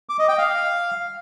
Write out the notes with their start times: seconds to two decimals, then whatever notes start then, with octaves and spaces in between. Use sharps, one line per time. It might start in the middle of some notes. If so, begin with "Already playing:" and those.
0.09 D6
0.19 D#5
0.29 G5
0.38 F5